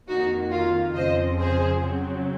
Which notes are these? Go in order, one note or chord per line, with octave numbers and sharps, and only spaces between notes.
F2 D#3 A#3 D#4 F#4
F4
F2 C#3 F3 C4 C5 D#5
G#4 C5
C#3 F#3 C4